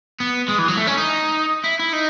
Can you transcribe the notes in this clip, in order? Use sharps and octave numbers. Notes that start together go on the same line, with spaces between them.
B3
G#3
E3
F#3
A3
C#4
D#4
E4
E4
D#4